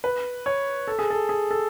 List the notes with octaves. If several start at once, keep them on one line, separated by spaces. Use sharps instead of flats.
B4
C#5
A4
G#4
A4
G#4
A4